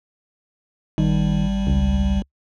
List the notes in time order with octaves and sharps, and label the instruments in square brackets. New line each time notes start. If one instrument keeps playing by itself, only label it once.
[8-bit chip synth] G#1 G3 [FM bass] D#3
[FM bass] C#2